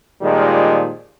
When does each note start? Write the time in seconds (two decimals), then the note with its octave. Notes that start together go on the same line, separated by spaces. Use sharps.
0.22 A#2 D#3 F3 G3 G#3